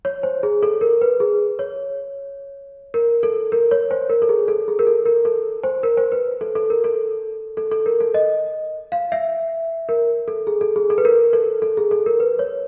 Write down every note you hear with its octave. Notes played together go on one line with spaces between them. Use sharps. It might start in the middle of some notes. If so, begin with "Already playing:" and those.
C#5
C5
G#4
A4
A#4
B4
G#4
C#5
A#4
A4
A#4
C#5
C5
A#4
A4
G#4
A4
G#4
A#4
A4
A#4
A4
C5
A#4
C5
B4
A4
A4
A#4
A4
A4
A4
A#4
A4
D#5
F5
E5
A#4
A4
G#4
A4
G#4
A4
B4
A#4
A4
A4
G#4
A4
A#4
B4
C#5